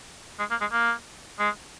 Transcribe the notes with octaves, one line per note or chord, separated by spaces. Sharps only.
G#3
A#3
G#3
A#3
G#3